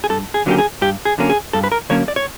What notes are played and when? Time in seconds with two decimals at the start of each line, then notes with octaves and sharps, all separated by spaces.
0.04 G#4
0.10 G2 A4
0.34 G#4
0.46 D3 F#3 A#3 C#4 G4
0.58 G#4
0.82 G2 G4
1.05 G#4
1.18 D3 F#3 A#3 C#4
1.30 G#4
1.53 G2 A4
1.64 B4
1.72 A#4
1.89 D3 F#3 A#3 C#4 C#5
2.08 D5
2.16 C#5